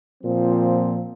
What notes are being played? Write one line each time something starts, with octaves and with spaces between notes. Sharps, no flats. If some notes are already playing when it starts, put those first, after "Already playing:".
A#2 F3 C4